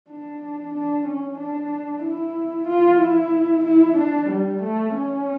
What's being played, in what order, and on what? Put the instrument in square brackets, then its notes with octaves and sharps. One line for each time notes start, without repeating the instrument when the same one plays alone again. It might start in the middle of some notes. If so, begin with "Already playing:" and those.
[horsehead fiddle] D4
D4
C#4
D4
E4
F4
E4
E4
D4
G3
A3
C#4